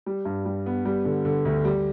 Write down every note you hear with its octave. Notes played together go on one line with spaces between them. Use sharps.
G3
G2
G3
B3
G3
D3
D3
D2
G3